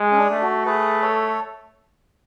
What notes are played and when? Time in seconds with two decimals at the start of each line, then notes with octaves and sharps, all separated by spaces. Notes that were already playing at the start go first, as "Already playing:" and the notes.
Already playing: G#3
0.11 C#4
0.18 D4
0.30 A3
0.42 F#4
0.65 A3 G#4 B4
1.02 A4 C#5